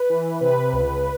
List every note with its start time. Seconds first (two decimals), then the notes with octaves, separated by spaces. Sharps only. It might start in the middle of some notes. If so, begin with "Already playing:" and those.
Already playing: B4
0.10 E3
0.41 C3 B4
0.73 C#2